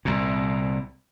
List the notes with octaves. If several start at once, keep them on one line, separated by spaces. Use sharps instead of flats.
C2 A#2